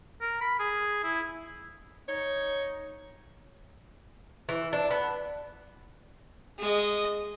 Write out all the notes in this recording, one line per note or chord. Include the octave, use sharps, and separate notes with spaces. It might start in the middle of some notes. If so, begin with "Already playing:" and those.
A#4
B5
G#4
E4
D#4 C#5
E3
D4
B3
G#3 D#5